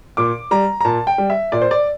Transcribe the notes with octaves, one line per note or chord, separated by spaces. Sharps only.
A#2 D6
G3 A#5
A#5
A#2 A5
G5
G3
E5
A#2 D5
C5
D5